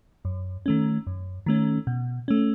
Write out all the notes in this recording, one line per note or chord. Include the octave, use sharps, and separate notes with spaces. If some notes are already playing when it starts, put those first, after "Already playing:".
F#2
D#3 A3 C#4
F#2
D#3 A3 C#4
B2
A3 C#4